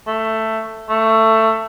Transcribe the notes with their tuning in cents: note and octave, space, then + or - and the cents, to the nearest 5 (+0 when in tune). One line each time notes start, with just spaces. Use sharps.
A3 +10
A3 +15